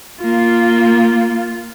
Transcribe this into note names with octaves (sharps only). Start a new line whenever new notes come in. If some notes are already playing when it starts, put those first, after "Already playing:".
A#3 F4